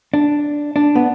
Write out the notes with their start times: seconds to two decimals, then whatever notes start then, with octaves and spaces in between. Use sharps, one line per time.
0.14 D4
0.76 D4
0.95 B3